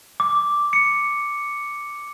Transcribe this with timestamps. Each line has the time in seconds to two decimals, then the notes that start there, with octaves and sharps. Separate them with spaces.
0.20 D6
0.73 C#7